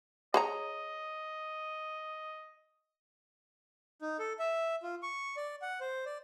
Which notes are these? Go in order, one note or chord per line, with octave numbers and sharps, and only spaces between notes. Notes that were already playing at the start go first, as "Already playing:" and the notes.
G#4 C#5 D#5 A#5
D#4
A4
E5
F4
C#6
D5
F#5
C5
D5